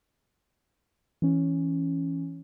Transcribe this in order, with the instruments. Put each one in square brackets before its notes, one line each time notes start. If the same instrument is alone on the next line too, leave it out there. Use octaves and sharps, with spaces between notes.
[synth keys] E3 C#4